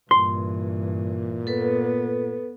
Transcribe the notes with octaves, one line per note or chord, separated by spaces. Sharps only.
G2 A#2 E3 C6
B3 A4 B4